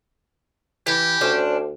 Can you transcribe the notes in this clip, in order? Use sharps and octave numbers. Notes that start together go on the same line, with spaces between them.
E3 G4
D2 C#4 D4 C5